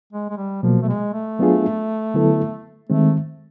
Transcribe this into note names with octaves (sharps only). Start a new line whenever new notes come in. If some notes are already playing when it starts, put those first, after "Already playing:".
G#3
G#3
G3
B2 F3 F#3 A#3
A3
G#3
A3
F#3 B3 D4 F4 G#4
D3 F#3 B3 E4 A4
D#3 G#3 A3 C4